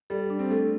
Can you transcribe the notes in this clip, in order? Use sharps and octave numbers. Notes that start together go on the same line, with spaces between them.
G3 A4
D4
C4
A3 A4